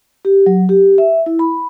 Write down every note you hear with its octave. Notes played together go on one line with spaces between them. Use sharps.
G4
F#3
G4
E5
E4
B5